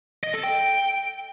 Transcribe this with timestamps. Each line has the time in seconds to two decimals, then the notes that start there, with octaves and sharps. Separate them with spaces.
0.24 D#5
0.34 A4
0.44 G5